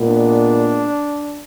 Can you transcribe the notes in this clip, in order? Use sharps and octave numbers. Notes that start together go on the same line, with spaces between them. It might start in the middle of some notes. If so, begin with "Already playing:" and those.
Already playing: A#2 G#3 B3
D4